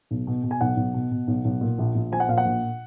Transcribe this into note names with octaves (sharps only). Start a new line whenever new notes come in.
B1
B2
B2
G#5
B1 F#5
B1
B2
B2
B1
B1
A#2
A#1
A#1
F3 G#5
F#5
A#2 F5
F#5
A#1